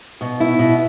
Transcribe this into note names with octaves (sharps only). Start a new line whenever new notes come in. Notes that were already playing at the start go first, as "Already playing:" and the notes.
B2
E4
B2